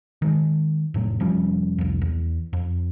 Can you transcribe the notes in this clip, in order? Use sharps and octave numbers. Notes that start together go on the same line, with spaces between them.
D#3 G#3
F1 A2 F#3
F1 F3 G3 C#4
C2 F2
E2
F2